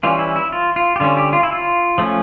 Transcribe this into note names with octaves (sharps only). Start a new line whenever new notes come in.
E3 G3 C#4 F4
E4
E4
F4
F4
G4
D3 G3 C#4 F4
G4
F4
E4
F4
F3 A3 C#4